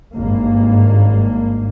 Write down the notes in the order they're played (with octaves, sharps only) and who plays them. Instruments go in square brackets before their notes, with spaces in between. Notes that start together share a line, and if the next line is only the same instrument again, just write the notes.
[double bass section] G#1 G2 A#3